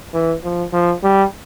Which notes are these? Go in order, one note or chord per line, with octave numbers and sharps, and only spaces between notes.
E3
F3
F3
G3